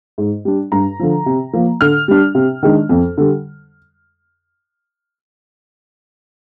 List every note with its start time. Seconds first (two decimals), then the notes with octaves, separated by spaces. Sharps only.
0.18 G#2
0.45 G3 D4
0.72 G2 A#5
1.00 D3 F3
1.26 C3
1.53 F3 A#3
1.81 D3 F6
2.08 G3 D4
2.35 C3
2.63 D#3 G#3 D4
2.89 F2
3.18 D3 G3